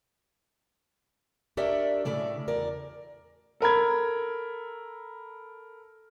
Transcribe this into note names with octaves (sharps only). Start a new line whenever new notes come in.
D4 G4 A#4 C#5 D5 E5
A2 C#3 A3 D5
E2 A#4 D5
A4 A#4 B5 G#6